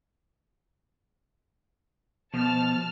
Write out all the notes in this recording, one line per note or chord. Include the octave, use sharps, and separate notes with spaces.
B2 F3 A5 F6